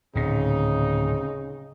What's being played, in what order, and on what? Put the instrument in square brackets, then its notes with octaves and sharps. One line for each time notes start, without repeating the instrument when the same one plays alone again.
[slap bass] D1 A#2 [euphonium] C#3 [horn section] C4 D#4